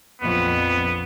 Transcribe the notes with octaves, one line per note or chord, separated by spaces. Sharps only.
A#1 F2 B3